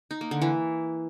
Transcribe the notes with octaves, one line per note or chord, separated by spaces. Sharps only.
D#4
A#3
D3
E3